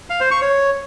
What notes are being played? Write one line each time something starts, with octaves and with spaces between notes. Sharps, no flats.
F5
C5
C#6
C#5